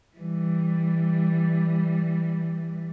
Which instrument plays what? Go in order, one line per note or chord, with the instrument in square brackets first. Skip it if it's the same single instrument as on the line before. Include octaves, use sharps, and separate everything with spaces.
[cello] E3 G3